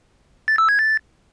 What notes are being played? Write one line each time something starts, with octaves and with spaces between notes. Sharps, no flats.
A6
E6
G#6
A6